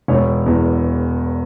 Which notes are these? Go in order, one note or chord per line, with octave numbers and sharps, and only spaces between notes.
E1 C#5
E2